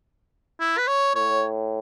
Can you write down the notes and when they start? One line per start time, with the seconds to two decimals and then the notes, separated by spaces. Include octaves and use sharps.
0.60 E4
0.78 B4
0.88 C#5
1.15 A2 C#5